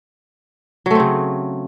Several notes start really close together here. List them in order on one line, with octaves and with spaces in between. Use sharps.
F#3 A3 C4 C#3